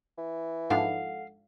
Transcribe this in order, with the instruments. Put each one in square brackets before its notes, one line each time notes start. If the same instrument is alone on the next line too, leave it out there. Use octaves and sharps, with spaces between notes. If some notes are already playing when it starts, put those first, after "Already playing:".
[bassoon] E3
[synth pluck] G#2 F3 D4 [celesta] A4 F#5 [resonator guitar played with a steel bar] F5